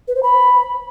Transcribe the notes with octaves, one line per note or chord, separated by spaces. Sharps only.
B4
C5
B5